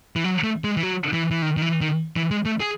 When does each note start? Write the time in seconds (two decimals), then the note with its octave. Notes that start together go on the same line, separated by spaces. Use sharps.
0.16 E3
0.24 F#3
0.44 A3
0.64 G#3
0.77 E3
0.83 F#3
1.13 E3
1.31 E3
1.42 D#3
1.57 D#3
1.62 E3
1.81 D#3
2.16 E3
2.31 G#3
2.46 A3
2.60 G#4